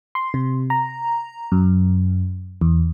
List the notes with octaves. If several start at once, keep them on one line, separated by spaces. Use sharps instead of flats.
C6
C3
A#5
F#2
E2